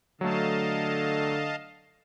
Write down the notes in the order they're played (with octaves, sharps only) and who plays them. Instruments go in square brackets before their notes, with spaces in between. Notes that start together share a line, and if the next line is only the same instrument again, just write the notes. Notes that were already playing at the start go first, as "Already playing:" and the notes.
[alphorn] D3 [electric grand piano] F#3 A3 [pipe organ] D#5 F5 A5